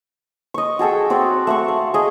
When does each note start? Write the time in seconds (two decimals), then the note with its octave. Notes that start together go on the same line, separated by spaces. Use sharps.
0.54 D#5 C#6
0.79 F#4 G#4 A4 G5
1.10 C4 F#4 D5
1.47 A3 F#5 C#6
1.68 F5
1.94 G#4 D#5